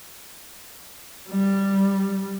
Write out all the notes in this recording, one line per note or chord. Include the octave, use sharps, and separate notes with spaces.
G3